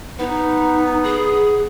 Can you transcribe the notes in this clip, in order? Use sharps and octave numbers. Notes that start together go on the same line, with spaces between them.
B3 D#4
G#4